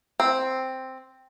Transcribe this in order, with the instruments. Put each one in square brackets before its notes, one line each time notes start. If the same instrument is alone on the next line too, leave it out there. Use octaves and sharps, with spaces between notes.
[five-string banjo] C4